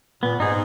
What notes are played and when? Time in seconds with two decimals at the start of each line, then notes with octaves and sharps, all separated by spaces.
0.23 A#2 B3
0.39 G#2 D#4 G#4